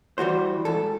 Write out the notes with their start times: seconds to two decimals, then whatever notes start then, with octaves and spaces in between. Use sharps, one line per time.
0.18 E3 G3 F#4 C5
0.65 G#2 A4